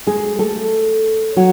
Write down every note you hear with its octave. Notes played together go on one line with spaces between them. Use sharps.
G#3 G#4
A3 A4
F#3 F#4